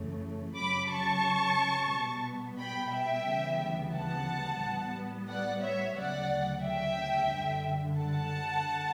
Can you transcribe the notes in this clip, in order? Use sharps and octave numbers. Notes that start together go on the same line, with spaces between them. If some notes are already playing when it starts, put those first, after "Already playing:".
Already playing: F#2 C#3 E3 A3
F#2 C#3 F#3 B5 D6
A5 C#6
B2 G3 B3
G5 B5
E5 G5
D2 C#3 E3 G3 B3
F#5 A5
A2 G3 B3
D5 F#5
C#5 E5
D2 C#3 F#3 D5 F#5
E5 G5
F#2 D3 G3
F#5 A5